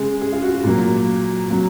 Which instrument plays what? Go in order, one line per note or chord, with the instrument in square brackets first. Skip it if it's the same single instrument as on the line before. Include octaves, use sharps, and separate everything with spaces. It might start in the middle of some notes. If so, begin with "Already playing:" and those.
Already playing: [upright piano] C#3 G#3 G#4
G#4
F4
F#4
F#4
A#2 F#3 A#3 F#4
F#3 A#3 F#4